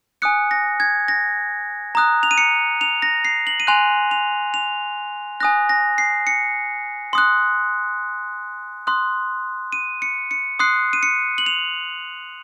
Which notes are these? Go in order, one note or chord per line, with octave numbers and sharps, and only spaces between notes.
G#5 D#6 F#6 C#7
A#6
G#6
A#6
A#5 D#6 F#6
F7
D#7
C#7
F7
A#6
C7
F#7
D#7
G#5 C6 F#6 F7
F7
F7
G#5 D#6 F#6 A#6
A#6
C7
C#7
C6 D#6 F#6
C6 D#6 F#6
D#7
C#7
C#7
C6 D#6 F#6 C7
D#7
C#7
F#7
F7